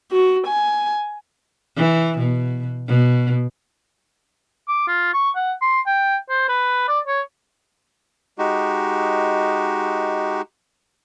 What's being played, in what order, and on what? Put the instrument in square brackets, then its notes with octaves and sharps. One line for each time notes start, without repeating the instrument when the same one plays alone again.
[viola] F#4
G#5
[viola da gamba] E3
B2
B2
[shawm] D6
F4
C#6
F#5
C6
G5
C5
B4
D5
C#5
[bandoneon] G#3 D#4 F#4 G4